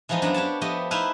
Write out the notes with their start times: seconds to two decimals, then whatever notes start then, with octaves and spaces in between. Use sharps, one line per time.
0.09 E3 F3 G#3 B3 D#4
0.22 F#2 F#3 B3 D4 A#5
0.34 D4 G4 C#5 A5
0.61 F3 A3 B3 G4 D#5
0.91 A3 D#4 E4 B4 C5 F5